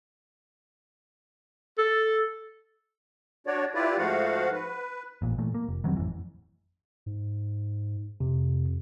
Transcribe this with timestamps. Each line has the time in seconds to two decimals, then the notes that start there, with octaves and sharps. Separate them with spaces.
1.78 A4
3.47 D4 F#4 C#5 D5
3.74 E4 F4 G4 B4 D5
3.98 G#2 F3 A3 F#4 F5 F#5
4.52 B4
5.22 A1 A#2
5.38 A#2 E3 A3
5.54 A#3
5.69 F1
5.84 D#3 F#3 G3 C4
5.97 A1 F2 E3
7.06 G#2
8.20 F2 C3